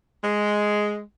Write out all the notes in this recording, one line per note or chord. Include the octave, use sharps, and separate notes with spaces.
G#3